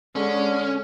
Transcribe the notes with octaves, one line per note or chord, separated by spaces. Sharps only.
D3 G#3 C#4